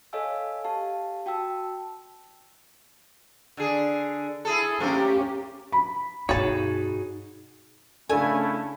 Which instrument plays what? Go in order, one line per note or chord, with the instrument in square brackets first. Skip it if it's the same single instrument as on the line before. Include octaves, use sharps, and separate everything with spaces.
[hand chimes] A4 C#5 D#5 F5 G#5 E6
G4 F5 A5
F#4 G5 A5 E6
[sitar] D3 G#4
E4 G#4 A4
[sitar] A3 A#3 C5 [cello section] C#4 G4
[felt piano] B5
[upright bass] G2 B2 [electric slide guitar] D#4 F#4 G#4 [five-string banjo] C#5 A5
[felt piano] C#3 D4 [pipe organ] A3 C#4 E4 [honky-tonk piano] A4 [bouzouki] G#5